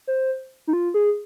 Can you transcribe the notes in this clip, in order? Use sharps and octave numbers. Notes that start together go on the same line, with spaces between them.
C5
D#4
F4
G#4